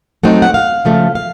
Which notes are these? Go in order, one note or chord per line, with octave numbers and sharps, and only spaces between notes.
F#3 A3 C4 D#4 F#5
F#5
F5
C#3 F3 A3
F5